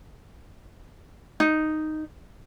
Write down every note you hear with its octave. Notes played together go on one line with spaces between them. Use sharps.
D#4